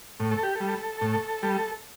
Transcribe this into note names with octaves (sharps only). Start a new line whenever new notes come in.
A2
A4
G4
G3 A4
A2
G3